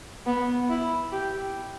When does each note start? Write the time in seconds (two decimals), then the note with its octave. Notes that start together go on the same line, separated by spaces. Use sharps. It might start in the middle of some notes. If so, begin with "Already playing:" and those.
0.26 B3
0.69 E4
1.12 G4